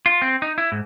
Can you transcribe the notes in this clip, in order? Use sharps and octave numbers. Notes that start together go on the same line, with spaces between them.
F4
C4
D#4
E4
G#2